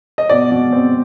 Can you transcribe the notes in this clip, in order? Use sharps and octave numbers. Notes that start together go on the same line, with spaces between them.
D#5
B2 D5
B2
C4